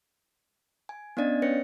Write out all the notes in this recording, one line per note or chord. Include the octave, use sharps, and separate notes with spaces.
G#5
B3 C#4 D4 D5 D#5 A6
C#4 B4 C#5 A#6 C#7